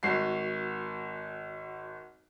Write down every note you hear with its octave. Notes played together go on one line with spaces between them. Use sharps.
G#1 F#4 C7